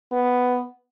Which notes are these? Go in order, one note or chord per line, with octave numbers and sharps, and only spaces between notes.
B3